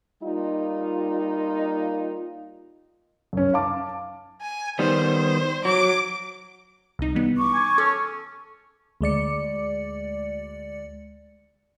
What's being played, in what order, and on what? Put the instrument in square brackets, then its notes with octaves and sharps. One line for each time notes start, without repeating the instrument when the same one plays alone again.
[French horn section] G3 A#3 D#4 F4
[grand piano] F#2 C#4
F5 A5 D6
[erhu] G#5
[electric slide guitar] D#3 G3 B3 [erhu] C5
[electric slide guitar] F#3 [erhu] D6
[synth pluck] C2 D#4
E3 G3 B3
[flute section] C#6 D6
[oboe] G#5
[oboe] C#4 [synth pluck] A4
[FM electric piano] D2 G#3 D5 C#7